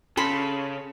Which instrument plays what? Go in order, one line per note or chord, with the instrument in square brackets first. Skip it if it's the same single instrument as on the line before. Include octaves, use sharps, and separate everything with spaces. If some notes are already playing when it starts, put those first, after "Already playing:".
[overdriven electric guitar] C#3 [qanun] A4 B5 C6